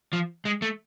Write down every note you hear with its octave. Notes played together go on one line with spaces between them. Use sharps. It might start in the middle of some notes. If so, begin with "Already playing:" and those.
F3
G#3
A3